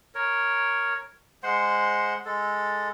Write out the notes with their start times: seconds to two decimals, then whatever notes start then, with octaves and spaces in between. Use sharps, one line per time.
0.15 A#4 C#5
1.43 G#3 C5 F#5 C6
2.25 G#3 A4